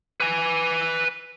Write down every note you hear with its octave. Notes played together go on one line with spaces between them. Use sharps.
B4 G#5